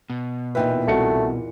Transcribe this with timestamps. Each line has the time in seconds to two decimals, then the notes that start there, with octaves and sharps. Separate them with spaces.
0.10 B2
0.55 E2 A#2 D#4 B4 E5 G5
0.88 C2 A3 F#4 C#7